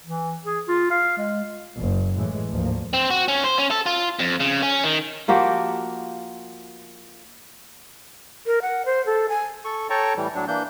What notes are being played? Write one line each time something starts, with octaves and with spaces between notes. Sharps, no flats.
E3
G#4
F4
F5
G#3
F#1
A2 E3 G#3
D2 G#2 F3 A#3
C4
F#4
C#4
C5
C#4
A4
F4
F2
C#3
C#4
D#3
F3 A#3 F#4 G4
A#4
F#5
C5
A4
G#5
A4 C#6
A4 C#5 G5 A5 A#5 C#6
A2 E3 G3
A2 F#3 D4
E3 A#3 D4 G6